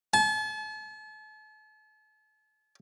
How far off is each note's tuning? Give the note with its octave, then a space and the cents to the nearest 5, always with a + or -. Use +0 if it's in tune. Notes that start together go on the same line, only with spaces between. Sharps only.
A5 -40